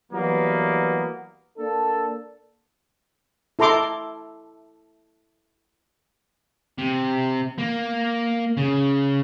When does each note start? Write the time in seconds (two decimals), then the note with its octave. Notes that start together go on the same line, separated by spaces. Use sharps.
0.11 E3 F#3 G3 A#3 B3
1.58 A#3 D4 A4
3.59 E4 A4 A#5 C6 D6
6.79 C3
7.58 A#3
8.58 C#3